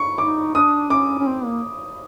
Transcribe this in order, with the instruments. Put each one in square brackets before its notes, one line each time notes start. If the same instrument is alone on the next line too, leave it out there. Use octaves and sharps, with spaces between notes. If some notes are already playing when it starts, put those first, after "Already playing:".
Already playing: [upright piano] C#6
[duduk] D#4 [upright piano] D6
[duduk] D4 [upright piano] D#6
[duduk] C#4 [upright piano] D6
[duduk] C#4
C4
A#3